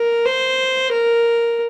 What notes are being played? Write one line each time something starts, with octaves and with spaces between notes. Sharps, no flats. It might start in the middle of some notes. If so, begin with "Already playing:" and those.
Already playing: A#4
C5
A#4